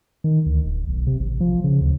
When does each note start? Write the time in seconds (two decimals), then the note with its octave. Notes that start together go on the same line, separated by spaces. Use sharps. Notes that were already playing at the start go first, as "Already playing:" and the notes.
0.24 D#3
0.46 D2
0.65 D1
0.88 B1
1.07 C3
1.20 A1
1.40 F3
1.64 C#3
1.81 D2